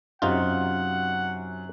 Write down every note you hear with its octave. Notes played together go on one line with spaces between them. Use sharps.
F#2 C3 D#4 F4 F#5